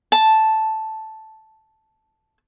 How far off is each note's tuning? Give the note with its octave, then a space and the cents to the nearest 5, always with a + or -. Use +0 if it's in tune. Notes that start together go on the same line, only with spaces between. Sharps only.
A5 -5